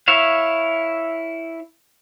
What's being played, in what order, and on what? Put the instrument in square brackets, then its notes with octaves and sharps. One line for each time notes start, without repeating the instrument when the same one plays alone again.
[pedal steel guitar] E4 C#5 E5 F5